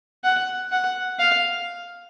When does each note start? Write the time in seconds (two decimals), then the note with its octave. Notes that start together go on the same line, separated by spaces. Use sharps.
0.24 F#5
0.72 F#5
1.19 F5